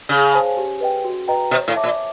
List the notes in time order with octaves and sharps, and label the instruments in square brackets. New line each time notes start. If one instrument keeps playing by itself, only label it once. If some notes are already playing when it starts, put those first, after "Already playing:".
[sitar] C#3 [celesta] G#4
[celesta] C5 F5 A5
G4
B4 D#5 G5
F#4
B4 D#5 G5 A#5
[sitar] B2 [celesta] C#5
[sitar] A2
[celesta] E5 A5 D6
[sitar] A#2